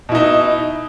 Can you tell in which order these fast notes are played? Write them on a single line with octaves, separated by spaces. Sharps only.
B2 E4 D#4